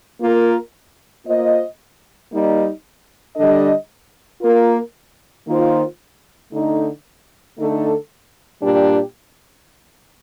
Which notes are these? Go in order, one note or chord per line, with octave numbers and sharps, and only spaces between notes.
A#3 F4 A#4
A#3 F4 C5 D#5
G3 A#3 D#4
D3 G3 D4 A4 D#5
A#3 F4 A#4
D#3 A#3 F4 C5
D3 A3 D#4
D3 A3 D#4 A4
A#2 G3 D4 G4